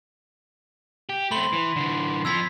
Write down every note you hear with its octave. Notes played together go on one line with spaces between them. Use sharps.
G4
A3 C4 B5 C6 F#7
E3
D3 E3
F2 F3 E6 G#6 B6